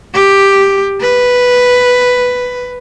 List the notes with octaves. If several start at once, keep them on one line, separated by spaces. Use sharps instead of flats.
G4
B4